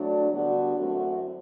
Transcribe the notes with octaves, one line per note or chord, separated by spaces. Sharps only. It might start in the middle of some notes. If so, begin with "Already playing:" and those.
Already playing: A2 F#3 A3 D4 F#4
D3 G3 B3 D4 F#4
F#2 E3 A3 C4 F#4